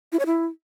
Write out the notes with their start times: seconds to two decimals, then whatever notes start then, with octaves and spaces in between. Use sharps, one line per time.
0.12 E4
0.19 C#5
0.26 E4